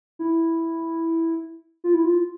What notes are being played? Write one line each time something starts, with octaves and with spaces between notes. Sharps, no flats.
E4
F4
E4
F4